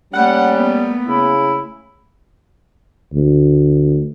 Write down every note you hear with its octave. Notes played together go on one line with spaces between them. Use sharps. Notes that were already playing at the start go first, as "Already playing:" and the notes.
G3 A3 A#3 C#4 F#5
B3
C#3 E4
D2